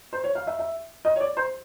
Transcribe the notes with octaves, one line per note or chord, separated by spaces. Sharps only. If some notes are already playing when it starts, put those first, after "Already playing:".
C5
C#5
F5
E5
E5
D#5
C#5
D5
C5